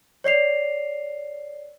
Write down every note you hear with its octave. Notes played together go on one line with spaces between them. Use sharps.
C#5 D5 C7 F7